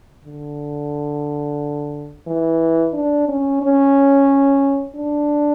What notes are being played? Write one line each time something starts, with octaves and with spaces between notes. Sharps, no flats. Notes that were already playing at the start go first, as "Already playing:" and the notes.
D3
E3
D4
C#4
C#4
D4